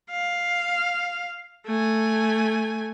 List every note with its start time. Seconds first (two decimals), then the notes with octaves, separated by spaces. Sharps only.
0.11 F5
1.66 A3 G#5